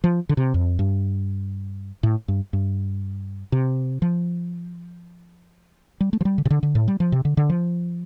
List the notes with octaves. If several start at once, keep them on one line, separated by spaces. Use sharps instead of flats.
F3
D3
C3
F2
G2
A2
G2
G2
C3
F3
G3
A3
F3
G3
D3
C3
D3
D3
A2
G3
F3
C3
D3
D3
F3